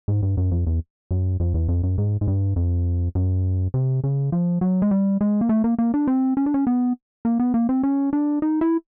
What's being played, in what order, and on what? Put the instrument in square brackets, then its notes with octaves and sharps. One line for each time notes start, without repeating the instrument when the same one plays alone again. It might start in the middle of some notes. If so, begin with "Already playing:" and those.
[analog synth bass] G#2
G2
F#2
F2
E2
F#2
F2
E2
F2
F#2
G#2
G#2
G2
F2
F#2
C3
C#3
F3
F#3
G#3
G3
G#3
A#3
A3
A#3
A#3
D4
C4
C#4
D4
C#4
B3
A#3
B3
A#3
C4
C#4
D4
D#4
E4